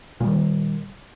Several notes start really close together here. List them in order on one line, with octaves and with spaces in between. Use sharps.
A#2 G3 D#3